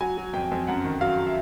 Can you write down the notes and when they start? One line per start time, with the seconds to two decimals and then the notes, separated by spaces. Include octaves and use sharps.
0.01 F#3 G#5
0.17 F#3
0.33 F2 G5
0.51 F2
0.67 F#2 F#5
0.84 D#3
1.01 F#3 F5
1.27 E5